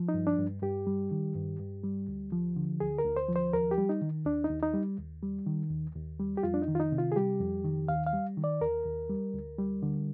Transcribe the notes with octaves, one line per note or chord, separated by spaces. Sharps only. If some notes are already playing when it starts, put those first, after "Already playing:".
Already playing: F3
D#4
G2
D4
G2
G2 G4
G3
D#3
G2
G2
G3
D2
F3
D3
D2 G#4
A#4
D2
C5
F3
C5
D#2 A#4
G4
G3
D#4
D#3
D#2 D4
D#4
D#2
D#4
G3
D#2
G3
D#3
D#2
D#2
G3
G4
F2 F4
D4
D#4
D#3
F4
D#4
C3
F4
G#4
G3 G4
F2
D#3
D#2 F5
F5
G3
D#3
D5
D#2 A#4
D#2
G3
D2
G3
D3